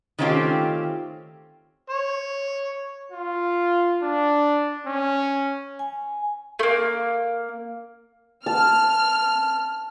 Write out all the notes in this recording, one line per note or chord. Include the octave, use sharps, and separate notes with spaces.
D#3 A3 C4 C#4 F4 G4
C#5
F4
D4
C#4
G#5
A3 A#3
A5 F6